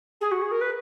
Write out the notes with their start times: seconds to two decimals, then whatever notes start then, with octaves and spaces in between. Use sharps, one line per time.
0.21 G#4
0.31 F#4
0.41 G#4
0.51 A#4
0.60 B4